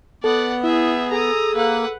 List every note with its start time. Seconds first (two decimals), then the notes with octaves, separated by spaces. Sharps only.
0.24 B3 A4 D5 F#5
0.64 E4 G#4 E5
1.12 G#4 A4 A#5 D#6
1.55 A#3 B4 F#5